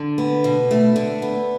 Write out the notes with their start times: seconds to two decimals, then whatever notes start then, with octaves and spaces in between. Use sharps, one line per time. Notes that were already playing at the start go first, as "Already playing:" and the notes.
Already playing: D3
0.18 B3
0.44 B2
0.71 A3
0.96 D3
1.22 B3